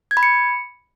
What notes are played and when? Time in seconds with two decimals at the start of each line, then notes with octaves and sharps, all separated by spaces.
0.11 G#6
0.17 B5
0.23 C#7